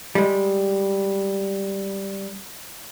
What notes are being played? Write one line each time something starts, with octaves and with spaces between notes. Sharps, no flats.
G3 G#3